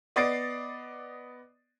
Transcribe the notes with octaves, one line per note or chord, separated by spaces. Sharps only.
B3 D5 D#5 A6 C7 D7